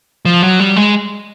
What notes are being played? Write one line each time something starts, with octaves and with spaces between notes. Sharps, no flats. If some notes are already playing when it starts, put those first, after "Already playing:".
F3
F#3
G3
G#3